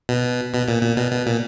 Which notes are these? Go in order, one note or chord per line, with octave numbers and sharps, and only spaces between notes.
B2
B2
A#2
A#2
B2
B2
A#2